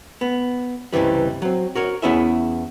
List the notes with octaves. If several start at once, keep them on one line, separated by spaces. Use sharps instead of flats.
B3
C#2 G2 C3 E3 G3
F#3 C4
F#4 A#4 C#5
E2 B3 C#4 E4 G#4 E5